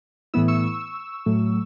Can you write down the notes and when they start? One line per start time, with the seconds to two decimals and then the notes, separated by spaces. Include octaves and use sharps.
0.34 A2 E3 B3 E4 E6
0.48 C#6 E6
1.26 A2 F#3 A3